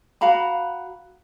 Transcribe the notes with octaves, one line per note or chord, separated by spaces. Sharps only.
F#4 F5 A#5 B5